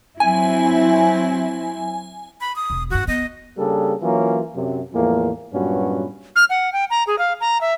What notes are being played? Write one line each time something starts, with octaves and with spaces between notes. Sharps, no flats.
F#3 C4 E4 G#5
B5
D#6
E1
G2 D#3 F#4
B3 D#5
C#3 G3 A#3 D4 G#4 A4
E3 F#3 A#3 C#4 F4
F#2 C3
E2 A2 F3 G#3 A#3
G2 A#2 F#3 B3 C#4 F#4
F6
F#5
G5
A#5
G#4
F5
A#5
E5